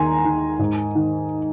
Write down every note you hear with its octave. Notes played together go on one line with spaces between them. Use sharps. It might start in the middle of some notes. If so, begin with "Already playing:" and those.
Already playing: D#2 D#3 G#5 A#5 C6
D#3
G#2
D#3